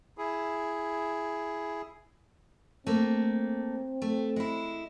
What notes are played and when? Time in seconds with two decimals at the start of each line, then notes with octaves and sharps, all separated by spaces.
0.18 E4 G#4
2.87 A3 A#3 C4
4.02 A3
4.36 G#3 E4